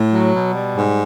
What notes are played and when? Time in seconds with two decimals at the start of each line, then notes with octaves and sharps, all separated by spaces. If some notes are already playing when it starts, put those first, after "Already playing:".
Already playing: A2
0.12 F#3
0.34 B2
0.54 G3
0.77 G#2